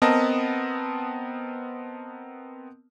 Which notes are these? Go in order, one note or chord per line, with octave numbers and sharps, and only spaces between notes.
B3 C4 A#4 D#5 A5